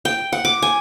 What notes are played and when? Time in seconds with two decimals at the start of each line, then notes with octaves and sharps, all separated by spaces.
0.05 G5
0.33 F#5
0.45 D6
0.62 G#5